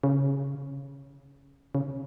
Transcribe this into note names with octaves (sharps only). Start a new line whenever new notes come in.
C#3
C#3